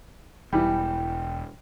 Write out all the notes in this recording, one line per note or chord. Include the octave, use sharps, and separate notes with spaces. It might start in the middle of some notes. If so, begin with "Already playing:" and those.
E1 E3 G3 G5